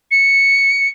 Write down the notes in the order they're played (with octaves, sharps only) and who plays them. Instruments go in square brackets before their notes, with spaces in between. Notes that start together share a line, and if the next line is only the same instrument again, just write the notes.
[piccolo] C#7